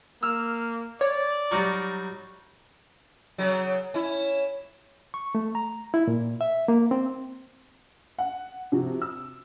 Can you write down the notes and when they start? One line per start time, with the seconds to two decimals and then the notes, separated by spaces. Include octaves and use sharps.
0.23 A#3 E6 F6
1.01 C#5 D5
1.51 F#3 G3 D#4 C#6 F6 A#6
3.38 C#3 F#3
3.94 C#4 E4
5.14 C#6
5.35 A3
5.55 A#5
5.94 E4
6.08 A#2
6.41 E5
6.68 A#3
6.91 C4
8.18 F#5
8.72 C3 F3 F#4
9.02 E6